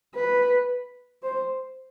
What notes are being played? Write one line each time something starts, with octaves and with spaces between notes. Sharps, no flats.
B4
C5